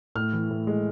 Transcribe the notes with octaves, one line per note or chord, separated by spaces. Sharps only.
A2 F6
E3
A2
G#3